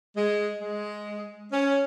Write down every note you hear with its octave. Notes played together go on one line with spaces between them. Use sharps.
G#3
G#3
C#4